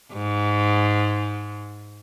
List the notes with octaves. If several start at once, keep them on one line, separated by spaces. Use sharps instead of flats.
G#2